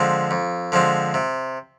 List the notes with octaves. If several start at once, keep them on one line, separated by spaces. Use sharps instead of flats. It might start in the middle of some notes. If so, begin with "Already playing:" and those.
Already playing: D3 F3 G#3 C4
F2
D3 F3 G#3 C4
C3